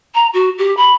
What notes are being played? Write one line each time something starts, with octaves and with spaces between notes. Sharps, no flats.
A#5
F#4
G4
B5